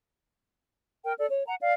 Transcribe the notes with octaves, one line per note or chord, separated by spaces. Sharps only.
A#4 G5
A4 D5
C#5
F#5 A#5
D5 F5